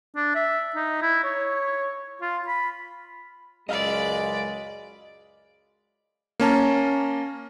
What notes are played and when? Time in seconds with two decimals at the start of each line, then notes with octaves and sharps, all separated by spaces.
0.16 D4
0.35 E5
0.76 D#4
1.02 E4
1.24 C#5
2.22 F4
2.48 B5
3.69 C#2 F#2 G#3 D5 D#5 F5 B5
6.40 A#3 C#4 A5 A#5